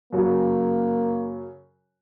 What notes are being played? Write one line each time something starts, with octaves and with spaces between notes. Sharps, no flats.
F#2 C#3 F#3 A#3 C#4 F#4